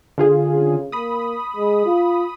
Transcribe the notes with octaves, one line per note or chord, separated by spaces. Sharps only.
D3 F4 G#4
C#3
A#3 B5 D#6
G#3
F4